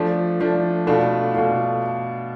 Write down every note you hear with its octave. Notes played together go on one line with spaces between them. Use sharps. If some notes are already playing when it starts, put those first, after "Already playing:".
Already playing: F3 A3 D4
F3 A3 D4
B2 A3 D4 F4
B2 A3 D4 F4